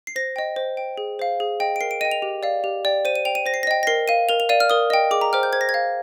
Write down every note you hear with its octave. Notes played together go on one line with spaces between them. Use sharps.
C7
C5 A#6
D#5 G5
C5
G5
G#4
C5 F5
G#4
D#5 G5
D7
A#4 C7
D7
D#5 G5 D#7
F7
G4
D5 F5
G4
D5 G5
C5 D#7
D#7
G5 F7
D#7
C5 A#6
C7
A#6
D#5 G5
A#6
A#4 C7
F5 D#7
A#4 F7
F7
D5 F5 D#7
F6
A#4 D#6
D#5 G5
G#4 D6
A#5
C5 G5 F6
G6
C5 G#6
A#6
G#6
F5